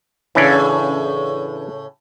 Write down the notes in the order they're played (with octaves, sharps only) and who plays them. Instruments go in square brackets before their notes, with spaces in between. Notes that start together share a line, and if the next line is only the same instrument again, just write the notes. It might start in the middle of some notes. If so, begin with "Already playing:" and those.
[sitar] A2 C#3 [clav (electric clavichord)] E3 C#4 D4